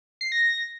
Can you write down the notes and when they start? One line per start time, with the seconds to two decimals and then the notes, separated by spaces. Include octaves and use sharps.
0.21 C7
0.32 A#6